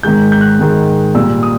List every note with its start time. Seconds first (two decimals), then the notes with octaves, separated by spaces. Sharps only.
0.03 G#2 D#3 G#3 G6
0.32 G6
0.41 F#6
0.59 G#2 D#3 G#3
1.15 A#2 G3 E6
1.43 D#6